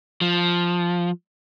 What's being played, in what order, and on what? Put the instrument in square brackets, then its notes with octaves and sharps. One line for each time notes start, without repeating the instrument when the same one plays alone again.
[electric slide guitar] F3